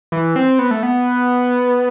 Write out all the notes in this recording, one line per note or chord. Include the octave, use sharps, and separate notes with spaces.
E3
C4
B3
A3
B3